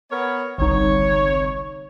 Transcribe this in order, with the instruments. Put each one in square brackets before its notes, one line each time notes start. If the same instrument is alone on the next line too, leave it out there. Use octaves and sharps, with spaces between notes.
[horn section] B3 A#4 C#5
[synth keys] G1 C2 D#4 [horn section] C#5